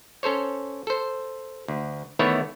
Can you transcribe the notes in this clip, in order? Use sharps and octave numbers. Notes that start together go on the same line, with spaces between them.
C#4 A4 C5 C#5
A4 C5
D2
D#3 E3 A3 B3 E4 C#5